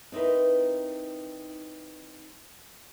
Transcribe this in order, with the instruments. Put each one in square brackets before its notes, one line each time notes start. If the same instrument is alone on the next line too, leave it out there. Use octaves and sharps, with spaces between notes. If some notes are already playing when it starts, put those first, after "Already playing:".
[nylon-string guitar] C4 D#4 E4 A#4 B4